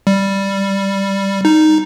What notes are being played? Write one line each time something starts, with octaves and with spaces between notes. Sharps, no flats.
G3
D#4